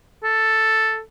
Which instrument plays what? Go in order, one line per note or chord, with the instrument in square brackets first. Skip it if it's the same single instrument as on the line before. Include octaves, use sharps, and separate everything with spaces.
[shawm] A4